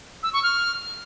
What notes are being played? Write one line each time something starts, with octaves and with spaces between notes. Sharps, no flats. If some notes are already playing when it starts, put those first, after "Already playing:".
E6
C#6
F6